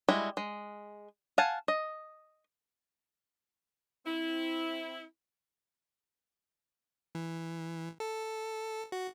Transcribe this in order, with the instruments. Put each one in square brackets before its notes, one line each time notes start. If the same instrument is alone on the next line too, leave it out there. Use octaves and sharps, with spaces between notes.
[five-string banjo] G3 G#3 E4 F#4
G#3
F5 F#5 G#5 A5
D#5
[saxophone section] C4 E4
[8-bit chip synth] E3
A4
F#4